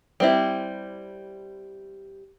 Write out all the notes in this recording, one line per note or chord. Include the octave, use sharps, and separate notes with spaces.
G3 C4 E4